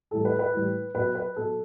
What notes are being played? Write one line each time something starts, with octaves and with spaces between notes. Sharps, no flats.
A2 E3 G3 A4
B4
B4
A2 E3 G3
B2 F#3 B4
B4
B2 F#3 A4